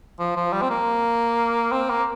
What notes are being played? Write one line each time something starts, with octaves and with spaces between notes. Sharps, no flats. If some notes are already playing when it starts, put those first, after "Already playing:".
F3
F3
G3
C4
A#3
C4
A#3